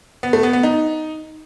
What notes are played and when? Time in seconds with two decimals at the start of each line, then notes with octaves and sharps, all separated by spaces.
0.23 B3
0.33 A3
0.43 B3
0.53 B3
0.63 D#4